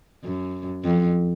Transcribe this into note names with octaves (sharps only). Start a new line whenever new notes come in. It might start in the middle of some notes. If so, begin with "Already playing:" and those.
F#2
F2